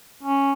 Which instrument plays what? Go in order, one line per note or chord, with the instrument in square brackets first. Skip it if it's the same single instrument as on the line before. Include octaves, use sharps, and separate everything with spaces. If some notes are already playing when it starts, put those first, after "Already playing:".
[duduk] C#4